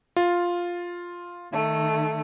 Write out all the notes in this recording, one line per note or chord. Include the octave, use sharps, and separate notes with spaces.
F4
D#3 A3